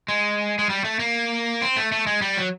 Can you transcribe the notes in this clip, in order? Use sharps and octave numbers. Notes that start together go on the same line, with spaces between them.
G#3
G#3
G3
A3
A#3
C4
A3
A3
G#3
G3
F#3